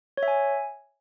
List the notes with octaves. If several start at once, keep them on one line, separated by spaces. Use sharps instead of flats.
C#5
E5
G#5